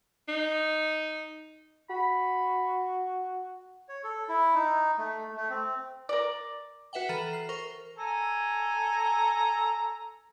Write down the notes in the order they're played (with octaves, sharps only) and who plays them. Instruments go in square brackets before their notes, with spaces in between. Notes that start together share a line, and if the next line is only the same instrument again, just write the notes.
[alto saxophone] D#4
[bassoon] F#4 [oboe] B5
[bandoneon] C#5
A4
E4
D#4
A3
A3
C4
[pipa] A#4 D5
[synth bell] F#4 B4 E5 F#5 G5
E3 A4 A#5 F6 D#7 F#7
F6 C7
A#4 C5 C#6
[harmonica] A4 G#5 A#5